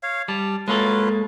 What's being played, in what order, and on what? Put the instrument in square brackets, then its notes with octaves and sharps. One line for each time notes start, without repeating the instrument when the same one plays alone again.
[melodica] C#5 F5
[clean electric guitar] G3 [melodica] A5
[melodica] F#3 F4 B4 [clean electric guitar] G#3 A#3 A4